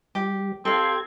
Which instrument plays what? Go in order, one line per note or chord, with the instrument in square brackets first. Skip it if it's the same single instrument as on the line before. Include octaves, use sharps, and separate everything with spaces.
[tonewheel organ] G3 [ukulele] G4
[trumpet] C4 [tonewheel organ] G4 G#6 [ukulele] A4 F5